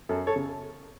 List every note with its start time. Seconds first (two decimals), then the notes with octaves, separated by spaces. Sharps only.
0.09 F#2 A4
0.27 A4 C#5
0.36 C#3